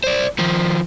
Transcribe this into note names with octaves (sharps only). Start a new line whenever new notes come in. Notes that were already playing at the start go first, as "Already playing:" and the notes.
C5 D5
D#3 F3